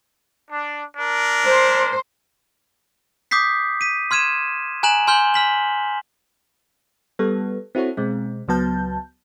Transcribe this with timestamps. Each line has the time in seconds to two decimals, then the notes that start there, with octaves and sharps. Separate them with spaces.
0.50 D4
0.97 D4 A#4
1.46 C5
3.31 D6 D#6 G6 B6 C7
3.81 B6 D#7
4.11 C6 F6 G#6 D#7 E7
4.83 G#5 A#5 F#6 E7 F#7
5.08 G#5 C6 F6 G6 G7
5.34 F6 B6 F#7
7.19 G3 B3 A4
7.75 C4 E4 F#4 A4 C#5
7.97 B2 G#3 C4
8.48 C#2 F#3 B3 A5 G6